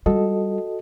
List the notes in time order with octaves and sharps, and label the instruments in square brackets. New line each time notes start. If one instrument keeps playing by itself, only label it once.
[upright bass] G3 F4 [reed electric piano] F#4 A4 D#5